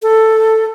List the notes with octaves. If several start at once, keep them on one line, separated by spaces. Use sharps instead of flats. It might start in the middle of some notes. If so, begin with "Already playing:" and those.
A4